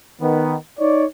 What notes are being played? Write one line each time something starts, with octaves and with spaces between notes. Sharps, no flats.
D#3 B3
D#4 C#5 D5